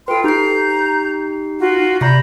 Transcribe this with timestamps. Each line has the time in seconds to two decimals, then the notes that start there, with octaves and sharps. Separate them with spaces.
0.08 F4 A4 B4 G5 C6
0.24 D#4 G4 A#5 G6 C7
1.59 F4 F#4
2.01 C3 D5 A#5 B5 C#6 G6 A#6